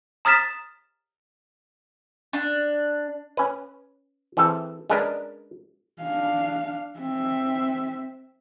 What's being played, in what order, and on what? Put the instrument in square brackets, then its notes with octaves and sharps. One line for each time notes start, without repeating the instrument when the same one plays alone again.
[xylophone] A#5 D#6 F6 A6 B6 E7
[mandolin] D4
[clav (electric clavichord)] C#4 B4
E3 C4 G#4 A4
G#3 C#4 D4 A#4 B4
[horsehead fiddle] D4 F5
C4 E5